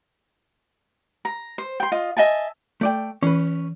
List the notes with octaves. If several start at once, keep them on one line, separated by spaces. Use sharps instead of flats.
A#5
C5
G5 C6
F4 D#5
D#5 E5 G#5 A5
A3 D5 G5
E3 C#4 B4